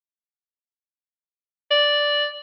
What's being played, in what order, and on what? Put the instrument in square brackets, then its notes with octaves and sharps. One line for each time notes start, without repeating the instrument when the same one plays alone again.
[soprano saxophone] D5